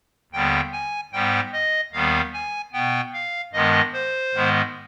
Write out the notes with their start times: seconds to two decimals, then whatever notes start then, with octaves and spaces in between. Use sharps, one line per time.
0.32 D#2 D3 G3 B3 G5
0.72 G#5
1.12 G#2 G3 B3 G5
1.53 D#5
1.92 D#2 D#3 G3 B3 F5
2.33 G#5
2.73 B2 B3 G5
3.13 F5
3.53 G2 D#3 G#3 B3 D#5
3.93 C5
4.34 G#2 D#3 G#3 B3